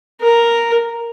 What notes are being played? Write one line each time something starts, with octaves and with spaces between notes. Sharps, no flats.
A#4